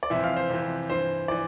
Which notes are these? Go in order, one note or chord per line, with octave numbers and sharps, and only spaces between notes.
D5
F2 C3 E3 E5
F5
C5
F2 C3 E3
G2 E3 C5
E3 D5